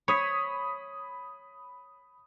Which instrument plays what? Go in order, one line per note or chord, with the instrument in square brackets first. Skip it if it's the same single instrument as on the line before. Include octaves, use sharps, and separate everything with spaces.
[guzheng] C#5 [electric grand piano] B5 D#6 B6